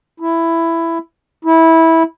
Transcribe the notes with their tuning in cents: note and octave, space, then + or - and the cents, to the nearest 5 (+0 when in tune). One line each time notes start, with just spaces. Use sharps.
E4 +10
E4 -15